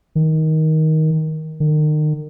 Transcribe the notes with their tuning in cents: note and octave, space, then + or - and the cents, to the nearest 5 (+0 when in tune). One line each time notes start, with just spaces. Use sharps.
D#3 +15
D#3 -35